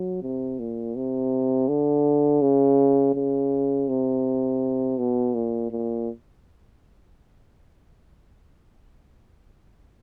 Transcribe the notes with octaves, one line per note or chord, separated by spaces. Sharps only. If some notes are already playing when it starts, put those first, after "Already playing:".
Already playing: F#3
C3
A#2
C3
D3
C#3
C#3
C3
B2
A#2
A#2